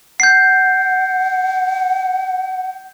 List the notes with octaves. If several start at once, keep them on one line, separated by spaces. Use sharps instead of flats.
F#5 G6 C7